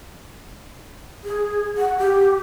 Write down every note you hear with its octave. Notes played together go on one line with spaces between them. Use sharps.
G#4
F#5
G4